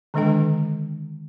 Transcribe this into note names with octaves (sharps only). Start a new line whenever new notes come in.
D3 D#3 G#3 D4 A4 G5